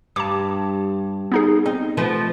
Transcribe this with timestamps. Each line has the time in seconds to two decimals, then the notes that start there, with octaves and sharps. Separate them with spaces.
0.16 G2 A5 D6
1.32 B3 D#4 G#4
1.66 C4 D#4
1.97 F3 A3 B3